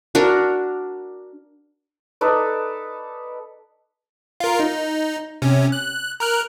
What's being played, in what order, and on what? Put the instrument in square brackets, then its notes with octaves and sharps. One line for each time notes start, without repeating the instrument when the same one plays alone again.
[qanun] D4 F#4 A#4
[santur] D#4 A4 B4 D5
[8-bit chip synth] F4 A#4
D#4
C3 C#4
F#6
A#4 F6 F#6